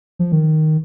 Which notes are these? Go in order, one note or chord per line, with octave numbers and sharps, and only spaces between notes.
F3
D#3